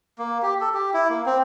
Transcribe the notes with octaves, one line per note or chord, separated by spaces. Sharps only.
A#3
G4
A4
G4
E4
A#3
C4